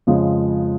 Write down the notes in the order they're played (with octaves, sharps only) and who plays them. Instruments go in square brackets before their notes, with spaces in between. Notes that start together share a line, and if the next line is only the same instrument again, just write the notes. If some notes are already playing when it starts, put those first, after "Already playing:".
[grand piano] F2 C#3 F3 G#3